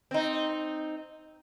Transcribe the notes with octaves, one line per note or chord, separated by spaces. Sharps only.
C4 D#4